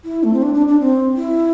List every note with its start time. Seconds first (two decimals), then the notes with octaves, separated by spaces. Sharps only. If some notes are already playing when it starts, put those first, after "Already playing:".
0.05 E4
0.24 A3
0.33 C4
0.43 D4
0.54 D4
0.68 D4
0.80 C4
1.17 E4